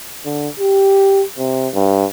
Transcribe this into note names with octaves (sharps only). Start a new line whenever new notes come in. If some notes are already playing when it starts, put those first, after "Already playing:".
D3
G4
C3
G2